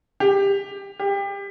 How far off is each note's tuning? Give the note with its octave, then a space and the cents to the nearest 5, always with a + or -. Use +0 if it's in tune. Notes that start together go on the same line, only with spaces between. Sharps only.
G4 +15
G4 +25